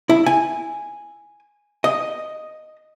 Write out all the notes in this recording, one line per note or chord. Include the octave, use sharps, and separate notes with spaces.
E4
G#5
D#5